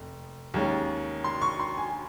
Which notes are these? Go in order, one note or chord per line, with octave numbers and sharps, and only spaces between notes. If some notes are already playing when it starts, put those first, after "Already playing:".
Already playing: F1
D#2 D#3 G#3 C#4
C6
C#6
C6
G#5